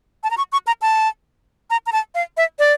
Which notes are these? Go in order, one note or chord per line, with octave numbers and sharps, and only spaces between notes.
A5
A#5
C#6
C#6
A#5
A5
A#5
A#5
A5
F5
E5
D5